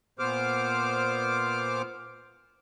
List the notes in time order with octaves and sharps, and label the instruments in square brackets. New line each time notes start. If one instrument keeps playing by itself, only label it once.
[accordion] A#2 B3 C5 D6 F6